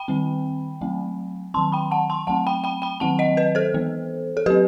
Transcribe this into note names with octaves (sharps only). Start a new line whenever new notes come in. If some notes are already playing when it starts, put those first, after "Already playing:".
Already playing: G5 B5
D#3 G3 C4
F#3 A3 C4
D#3 F#3 C4 A5 C6
G5 B5
F#5 A5
A5 C6
F#3 A3 C4 F#5 A5
G5 B5
G5 B5
G5 B5
D#3 F#3 C4 F#5 A5
D#5 F#5
B4 D#5
A4 C5
E3 B3
A4
F#3 C4 G4 B4